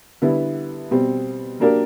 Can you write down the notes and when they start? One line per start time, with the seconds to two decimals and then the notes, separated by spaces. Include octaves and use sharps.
0.22 D3 G3 B3 E4
0.91 B2 G3 C4
1.60 F#3 A#3 D4 G4 A#4